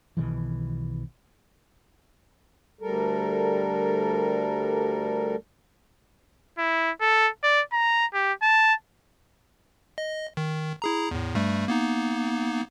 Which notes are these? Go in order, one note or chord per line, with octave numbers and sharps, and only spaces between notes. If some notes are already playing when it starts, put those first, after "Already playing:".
B1 B2 D#3 E3
D2 G3 A4 A#4
E4
A4
D5
A#5
G4
A5
D#5
D#3
E4 G#4 A#5
E2 A2
G2 G3 A3
A#3 B3 D#4